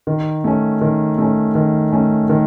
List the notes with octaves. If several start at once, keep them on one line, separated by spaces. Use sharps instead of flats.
D#3
A3 C#4
D#3
A3 C#4
D#3
A3 C#4
D#3